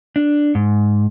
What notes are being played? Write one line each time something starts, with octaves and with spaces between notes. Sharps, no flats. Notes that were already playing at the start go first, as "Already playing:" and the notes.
D4
G#2